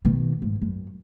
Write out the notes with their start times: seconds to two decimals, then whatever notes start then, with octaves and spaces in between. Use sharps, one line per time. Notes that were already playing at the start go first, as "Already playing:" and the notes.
0.05 B2 D#3
0.42 G#2
0.62 F#2